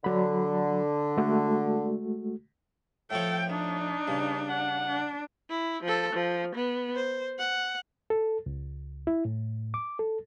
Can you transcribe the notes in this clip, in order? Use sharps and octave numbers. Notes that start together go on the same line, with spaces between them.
D3 F#3 B5
G#3 A3 F#4
A2 F3 A4 C#5 G5
D4 D#4
G2 C#3
F#5
D4
E4
F3 A4
F3
B3
C5
F#5
A4
C#2
E4
A2
D6
A4